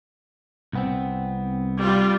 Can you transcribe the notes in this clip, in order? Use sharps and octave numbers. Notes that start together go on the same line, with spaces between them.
C2 B3 C4
G3 F4